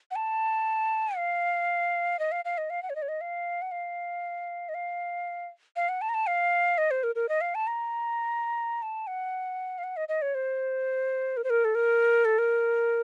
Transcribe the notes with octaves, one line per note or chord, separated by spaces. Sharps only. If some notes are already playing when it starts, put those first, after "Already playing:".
F#5
A5
F5
D#5
F5
F5
D#5
F5
F#5
C#5
D#5
C#5
D#5
F5
F#5
F5
D#5
F5
F5
F#5
A5
A#5
A5
F5
D#5
C5
A#4
A#4
D#5
F5
A5
A#5
A5
F#5
F5
F#5
D#5
D#5
C#5
C5
A#4
C5
A#4
A4
A#4
A4
A#4